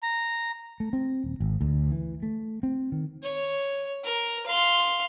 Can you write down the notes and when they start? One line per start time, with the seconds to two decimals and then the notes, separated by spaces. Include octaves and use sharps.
0.03 A#5
0.80 A3
0.93 C4
1.24 D#1
1.40 G#1
1.61 D2
1.92 E3
2.23 A3
2.63 C4
2.92 D#3
3.23 C#5
4.04 A#4
4.47 F5 C6